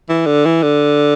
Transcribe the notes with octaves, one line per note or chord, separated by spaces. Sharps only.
E3
D3
E3
D3